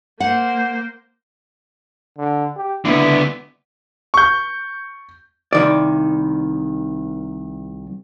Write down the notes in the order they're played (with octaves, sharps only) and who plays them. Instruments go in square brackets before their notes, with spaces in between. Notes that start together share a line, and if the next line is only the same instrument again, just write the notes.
[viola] A#3 C5 [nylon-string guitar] F#5
[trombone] D3
G4
[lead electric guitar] C#2 D3 [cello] B3 [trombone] E4
[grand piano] C#6 G6
[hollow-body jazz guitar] C2 D#3 D5